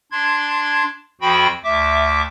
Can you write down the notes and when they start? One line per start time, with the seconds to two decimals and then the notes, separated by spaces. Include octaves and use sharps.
0.12 D4 C6 G#6
1.21 F2 F3 F#4 G5 B5
1.64 D2 E5 D6